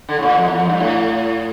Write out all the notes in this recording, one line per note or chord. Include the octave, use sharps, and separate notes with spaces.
D3
A2
A#2
F2
E2
F2
G2
A2